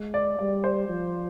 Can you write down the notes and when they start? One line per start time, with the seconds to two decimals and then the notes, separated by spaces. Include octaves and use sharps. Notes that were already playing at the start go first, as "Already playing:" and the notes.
Already playing: G#3
0.14 D5
0.39 G3 D5
0.64 C5
0.89 F3